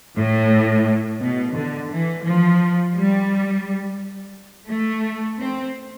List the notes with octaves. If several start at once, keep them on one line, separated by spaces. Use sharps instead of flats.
A2
B2
D3
E3
F3
G3
A3
C4